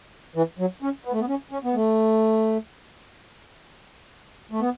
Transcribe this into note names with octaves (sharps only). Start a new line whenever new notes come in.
E3
F#3
C#4
B3
A3
B3
C#4
C#4
B3
A3
A3
B3